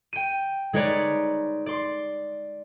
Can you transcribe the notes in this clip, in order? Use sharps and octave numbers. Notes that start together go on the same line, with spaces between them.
G5 D#7
G#3 D#4 B4 C#5 D5
D5 C6